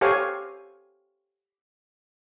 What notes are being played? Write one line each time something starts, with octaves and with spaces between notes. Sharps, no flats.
G4 A4 C5 C#5 F5 G#5